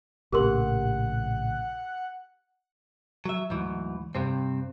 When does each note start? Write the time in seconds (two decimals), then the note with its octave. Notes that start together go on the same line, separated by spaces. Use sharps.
0.32 A#1 A2 C#3 G4 A#4 F#5 C6
3.26 F#3 E5
3.50 D2 G#2 E3 F#3
4.15 G2 C3 C4